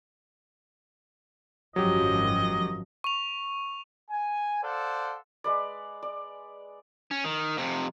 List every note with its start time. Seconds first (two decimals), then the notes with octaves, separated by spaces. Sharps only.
1.76 G#1 F#2 F3 F#3 G4 D#5
3.04 C#6 F7
4.10 G#5
4.63 A4 C5 D5 F5 F#5
5.44 G#3 B4 D5
6.03 D5
7.11 C#4
7.24 D#3
7.57 F2 C3